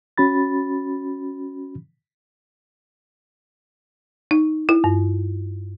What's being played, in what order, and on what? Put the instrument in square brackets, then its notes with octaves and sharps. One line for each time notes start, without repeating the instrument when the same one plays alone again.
[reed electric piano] C#4 F#4 B5 A6
[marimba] D#4
E4
G2